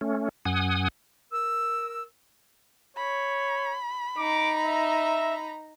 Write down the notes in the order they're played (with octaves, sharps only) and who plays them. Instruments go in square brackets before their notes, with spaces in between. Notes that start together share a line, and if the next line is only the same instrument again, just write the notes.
[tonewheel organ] A3 C#4
F#2 F#5 G#5 D#6
[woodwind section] A#4 E6
[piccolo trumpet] C#5 [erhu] B5
[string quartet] D#4 A#5 [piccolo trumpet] D6
[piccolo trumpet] E5